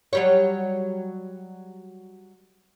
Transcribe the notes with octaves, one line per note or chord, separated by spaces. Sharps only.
F#3 G3 C#5